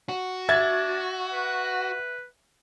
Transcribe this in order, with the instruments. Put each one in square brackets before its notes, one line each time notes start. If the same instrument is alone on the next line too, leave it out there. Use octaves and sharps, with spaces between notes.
[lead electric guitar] F#4
[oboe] D4 [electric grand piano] E5 [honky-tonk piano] G#6 A6
[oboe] B4